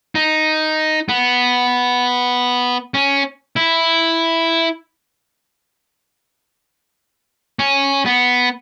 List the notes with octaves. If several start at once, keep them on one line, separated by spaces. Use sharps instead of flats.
D#4
B3
C#4
E4
C#4
B3